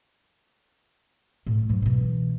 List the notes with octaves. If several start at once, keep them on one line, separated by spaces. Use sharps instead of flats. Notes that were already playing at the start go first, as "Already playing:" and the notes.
A2
G#2 F#3
B2 E3